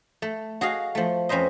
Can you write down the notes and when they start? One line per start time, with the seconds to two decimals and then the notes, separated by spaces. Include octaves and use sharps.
0.22 A3
0.61 F#4 G#4 D#5 F5
0.95 F3 A3
1.29 F2 C#4 B4 C5 D#5